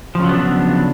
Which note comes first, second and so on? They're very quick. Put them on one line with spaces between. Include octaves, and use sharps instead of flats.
F3 C#3 F#3 B3 D4